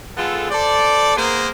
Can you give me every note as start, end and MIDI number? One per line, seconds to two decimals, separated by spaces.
0.17 0.48 56
0.17 0.48 59
0.17 0.48 65
0.17 0.48 69
0.51 1.15 69
0.51 1.15 72
0.51 1.15 74
1.17 1.49 58
1.17 1.49 59
1.17 1.49 68
1.17 1.49 70
1.17 1.49 72